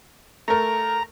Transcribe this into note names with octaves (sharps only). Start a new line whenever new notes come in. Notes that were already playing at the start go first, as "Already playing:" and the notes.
A3 A#4 A#5